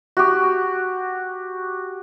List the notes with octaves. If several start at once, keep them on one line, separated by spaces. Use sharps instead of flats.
F#4 G4